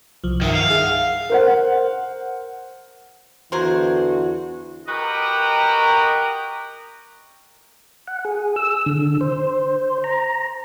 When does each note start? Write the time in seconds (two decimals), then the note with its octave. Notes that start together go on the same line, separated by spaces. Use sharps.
0.24 C2 F3
0.42 G2 D#3 E5 F#5
0.55 F5
0.70 G#4 E5 F#5
1.30 A#4 C5 F#5
3.52 E2 D3 E3 F#4 G#4 A#4 C5
4.89 F#4 G4 A#4 B4 D#5 G5
8.07 F#5
8.25 G#4
8.56 E6
8.86 D3
9.21 C5
10.04 A#5